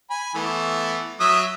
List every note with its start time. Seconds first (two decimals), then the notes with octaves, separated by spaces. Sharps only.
0.10 G#5 B5
0.35 E3 A3 B3
1.20 F#3 E5 D#6